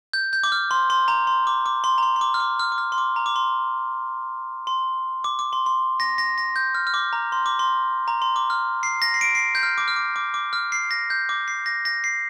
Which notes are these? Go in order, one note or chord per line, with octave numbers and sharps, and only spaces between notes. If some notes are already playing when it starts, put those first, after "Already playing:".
G6
G6
D6
F6
C6
C6
A#5
C6
D6
D6
C6
A#5
C6
C6
D6
F6
D6
F6
D6
F6
C6
D6
A#5
D6
C6
C6
D6
D6
C6
C6
A#6
A#6
A#6
G6
F6
F6
D6
A#5
C6
D6
C6
A#5
C6
D6
F6
C7
A#6
C7
D7
C7
G6
F6
D6
F6
D6
D6
D6
F6
C7
A#6
G6
D6
C7
A#6
A#6
C7